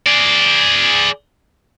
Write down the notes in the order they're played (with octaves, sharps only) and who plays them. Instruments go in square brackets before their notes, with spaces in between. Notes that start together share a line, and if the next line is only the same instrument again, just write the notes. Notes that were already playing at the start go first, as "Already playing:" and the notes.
[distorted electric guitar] G#4 D5